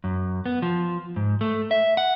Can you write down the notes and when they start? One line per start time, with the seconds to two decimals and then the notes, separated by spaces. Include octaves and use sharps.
0.04 F#2
0.46 B3
0.62 F3
1.16 G#2
1.41 A3
1.71 E5
1.97 F#5